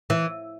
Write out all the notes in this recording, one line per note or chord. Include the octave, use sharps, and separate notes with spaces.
E3